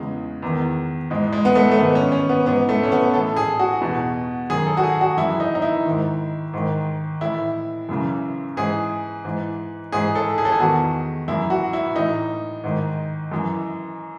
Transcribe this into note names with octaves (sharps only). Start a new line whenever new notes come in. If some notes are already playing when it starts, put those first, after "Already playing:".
Already playing: E2 C#3 E3 G#3
E2 D#3
G#2 E3 G#3
G#3
B3
A3
A3
G#2 D#3 B3
C#4
C#4
B3
G#2 E3 B3
A3
C#4
B3
A2 E3 A4
G#4
F#4
E2 B2
F#2 D#3 G#4
A4
F#4
G#4
F#4
F#2 E3 E4
D#4
D#4
E4
G#2 D#3
G#2 D#3
A2 E3 E4
F#2 C#3 E3
G#2 E3 G#4
G#2 E3
G#2 E3 G#4
A4
G#4
A4
G#4
E2 D#3 F#4
F#2 E3 E4
F#4
E4
A2 E3 D#4
G#2 D#3
F#2 E3